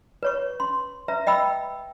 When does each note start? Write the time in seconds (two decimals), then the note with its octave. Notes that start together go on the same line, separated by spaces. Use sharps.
0.23 B4 C#5 C#6
0.60 C6
1.08 B4 E5 A#5
1.27 D#5 G5 B5 E6